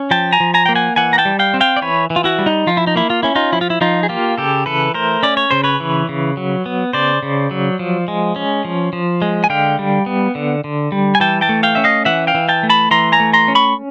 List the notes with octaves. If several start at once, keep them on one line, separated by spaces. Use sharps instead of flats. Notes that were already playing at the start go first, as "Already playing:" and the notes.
Already playing: C#4
F3 G5 A5
G#5 A#5
F3
G#5 A#5
A#3 G5
F#5 G#5
E3 F#5 G#5
A#5
G5 A5
G3
F5 G5
C4
F5 G5
D5
E3 B4 C#5
E3
F4
E4 F#4
G3
D#4
F3 F4
E4
D#4
A#3 E4
F4
C#4 E4
D#4 F4
F3 E4
F4
E4
F3 D#4 F4
G#4
A#3 F4 G4
C#3 G4 A4
E3 A4 B4
A3 A#4 C5
C#4 D5
C#5
C#3 C5
B4 C#5
E3
C#3
F#3
B3
C#3 C5 D5
C#3
F#3
F3
G#3
C#4
F3
F3
G#3
G#5
D3 F5 G5
G3
B3
D3
D3
G3
G#5
E3 G5 A5
G5 A5
A3
F5 G5
C#4 E5
D#5 F5
E3 E5 F#5
F5 G5
E3
G5 A5
A3
A5 B5
E3 A#5 C6
G#5 A#5
A3
A#5 C6
C#4
B5 C#6